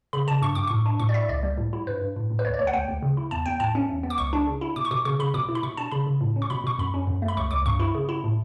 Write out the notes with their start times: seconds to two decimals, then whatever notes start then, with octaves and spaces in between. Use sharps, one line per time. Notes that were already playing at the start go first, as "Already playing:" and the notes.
0.13 C#3 B5
0.27 C#3 A5
0.42 G2 C#6
0.55 G2 D6
0.67 A2 C#6
0.86 D4
1.00 A2 C#6
1.09 D5
1.14 E4 E5
1.29 C#2 D5
1.43 G3
1.58 A2
1.73 E4
1.87 G2 B4
2.01 G2
2.16 A2
2.30 A2
2.39 B4
2.45 D2 C#5
2.54 D5
2.59 D2 C#5
2.67 F#5
2.73 D2 G5
2.88 D2
3.03 C#3
3.17 E4
3.31 E2 A5
3.46 E2 G5
3.60 A2 A5
3.75 C#4
3.89 E2
4.03 B3
4.10 D6
4.18 C#2 C#6
4.33 D4
4.47 C#3
4.61 E4
4.76 B2 D6
4.85 C#6
4.91 B2 D6
5.05 C#3 C#6
5.19 C#3 B5
5.34 B2 D6
5.49 E4
5.55 B5
5.63 B2 C#6
5.77 D4 A5
5.92 C#3 B5
6.07 C#3
6.21 A2
6.36 C#4
6.42 C#6
6.50 B2 B5
6.64 B2 C#6
6.79 F#2 B5
6.94 C#4
7.07 F#2
7.22 A3
7.28 B5
7.37 C#2 C#6
7.51 C#2 D6
7.66 G2 C#6
7.80 E4
7.95 C#3
8.09 E4
8.24 A2